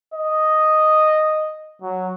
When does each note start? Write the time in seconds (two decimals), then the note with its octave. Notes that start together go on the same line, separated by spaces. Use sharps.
0.14 D#5
1.82 F#3